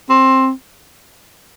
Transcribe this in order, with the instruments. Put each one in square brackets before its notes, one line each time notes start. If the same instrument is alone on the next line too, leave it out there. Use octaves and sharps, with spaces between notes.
[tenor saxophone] C4